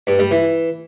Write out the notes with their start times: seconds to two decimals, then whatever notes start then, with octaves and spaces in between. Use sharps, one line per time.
0.07 G2
0.19 G3
0.31 E3